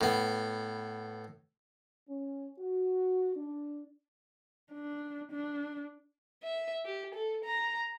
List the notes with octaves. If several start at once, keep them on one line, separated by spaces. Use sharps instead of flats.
A2 B3
C#4
F#4
D4
D4
D4
E5
G4
A4
A#5